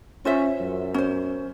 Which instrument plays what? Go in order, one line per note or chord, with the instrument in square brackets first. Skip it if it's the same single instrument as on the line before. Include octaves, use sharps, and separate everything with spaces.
[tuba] C#4 [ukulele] F4 C5 E5
[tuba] F#2
[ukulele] C#4 C5